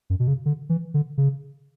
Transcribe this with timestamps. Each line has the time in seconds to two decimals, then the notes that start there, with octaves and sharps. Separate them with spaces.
0.10 F#2
0.20 B2
0.28 C#3
0.46 D3
0.69 E3
0.94 D3
1.18 C#3